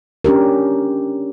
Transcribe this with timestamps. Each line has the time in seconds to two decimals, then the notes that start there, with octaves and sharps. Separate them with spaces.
0.25 C#4 D4 G4 A#4